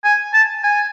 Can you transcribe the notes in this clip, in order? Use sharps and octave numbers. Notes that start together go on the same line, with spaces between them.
G#5
A5
G#5